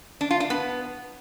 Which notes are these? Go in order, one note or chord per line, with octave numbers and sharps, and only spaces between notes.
D4
F4
D4
B3